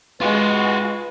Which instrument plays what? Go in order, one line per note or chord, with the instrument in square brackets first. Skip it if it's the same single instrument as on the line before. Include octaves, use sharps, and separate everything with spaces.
[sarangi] G#3 [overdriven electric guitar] F4 F#4 [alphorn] B4